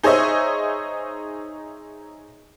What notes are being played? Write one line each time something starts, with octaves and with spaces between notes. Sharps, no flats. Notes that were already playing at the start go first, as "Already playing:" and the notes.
D#4 G#4 C5 C#5 D#5 E5